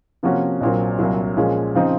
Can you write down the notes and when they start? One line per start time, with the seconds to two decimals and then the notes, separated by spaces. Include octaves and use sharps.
0.23 C3 F3 A#3 C#4 F#4
0.61 A#1 A#2 F#3 C4
0.99 C2 A#2 F#3
1.37 A#2 F3 G#3 C#4
1.75 C#3 F3 C4 D#4